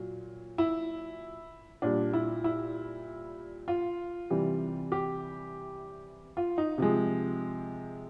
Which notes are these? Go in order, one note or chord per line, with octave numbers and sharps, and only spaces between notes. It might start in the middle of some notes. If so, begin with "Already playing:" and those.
Already playing: A#2 F#3
E4
A#2 G3 D4
E4
E4
F4
C3 E3 G3
G4
F4
D#4
C3 F3 G#3